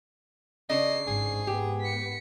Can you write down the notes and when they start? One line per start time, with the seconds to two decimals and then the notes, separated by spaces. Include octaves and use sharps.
0.70 C#3 D4 D#5 C7
1.07 G#1 G#2 G#4
1.47 G#2 B3 G4
1.81 B6 C#7